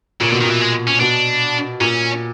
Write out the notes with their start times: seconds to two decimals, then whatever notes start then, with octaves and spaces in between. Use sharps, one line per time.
0.21 A#2 C#3
0.30 B2 D3
0.41 D#3
0.44 A#2
0.50 E3
0.60 G#3
0.88 C#4
1.01 B2 D4
1.81 A#2 C#4